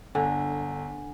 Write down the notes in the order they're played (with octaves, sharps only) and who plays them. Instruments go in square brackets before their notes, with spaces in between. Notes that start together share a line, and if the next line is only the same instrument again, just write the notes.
[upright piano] G1 [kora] D3 [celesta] G#5